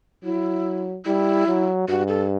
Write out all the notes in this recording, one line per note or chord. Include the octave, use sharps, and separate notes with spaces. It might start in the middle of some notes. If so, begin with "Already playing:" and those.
F#3 E4
G3 E4
F#3
G2 F#4
A4